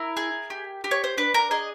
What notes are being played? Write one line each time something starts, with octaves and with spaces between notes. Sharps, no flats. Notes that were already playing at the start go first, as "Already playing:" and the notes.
Already playing: E4 A#4
G#4
G4
G4
C#5
C5
D4 B4
A#4
G#4 D#5